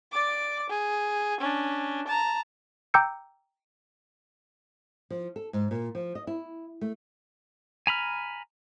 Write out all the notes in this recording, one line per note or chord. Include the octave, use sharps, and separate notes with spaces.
D5 D6
G#4
C#4 D4
A5 A#5
G5 A#5 D6 E6 G6 C#7
F3
A4
G#2
A#2
F3
D#5
E4
A3
G#5 A#5 B5 F6